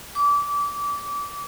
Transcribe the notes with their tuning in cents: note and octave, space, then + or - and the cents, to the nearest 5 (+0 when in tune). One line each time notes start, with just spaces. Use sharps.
D6 -25